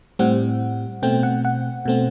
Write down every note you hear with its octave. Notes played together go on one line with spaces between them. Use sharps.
A2 G3 C4 F#5
B2 A3 C4 G5
F#5
F#5
B2 A3 C4